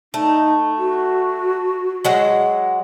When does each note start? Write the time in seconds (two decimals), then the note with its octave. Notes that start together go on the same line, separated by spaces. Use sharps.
0.14 A3 D#4
0.78 F#4
2.05 F#3 G#3 F#5